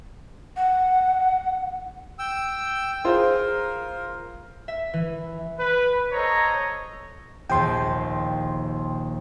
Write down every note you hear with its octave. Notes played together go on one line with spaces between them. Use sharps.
F#5
G5 E6
F4 G#4 A#4 C5
E5
E3
B4
A4 C5 C#5 D#5 A#5
A#1 D#2 G5 C6